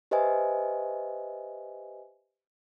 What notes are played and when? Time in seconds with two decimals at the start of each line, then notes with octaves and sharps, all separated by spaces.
0.11 G4 B4 C5 D#5 E5 G#5